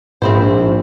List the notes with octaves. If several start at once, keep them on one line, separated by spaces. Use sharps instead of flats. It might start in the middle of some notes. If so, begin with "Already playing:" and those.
A#1 G#2 C4 E4 C5